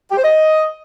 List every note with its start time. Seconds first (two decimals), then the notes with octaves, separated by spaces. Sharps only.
0.11 G4
0.17 C5
0.24 D#5